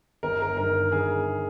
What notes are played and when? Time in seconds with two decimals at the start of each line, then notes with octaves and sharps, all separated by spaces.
0.23 G1 A#4
0.42 A#4
0.57 G2 D#3 A#4
0.92 G1 G#4